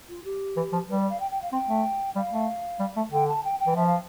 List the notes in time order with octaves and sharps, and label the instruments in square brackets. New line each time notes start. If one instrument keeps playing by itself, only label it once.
[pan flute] F4
G4
[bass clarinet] E3
F3
[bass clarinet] G3 [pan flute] B4
[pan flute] D5
F5
G5
G5
F5
[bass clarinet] C4 [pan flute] G5
[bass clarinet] A3
[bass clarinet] G3 [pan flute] F5
[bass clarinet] A3
G3
A3
[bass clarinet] D3 [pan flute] G5
[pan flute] A5
G5
G5
[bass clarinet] E3
[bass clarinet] F3 [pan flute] E5
[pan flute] F5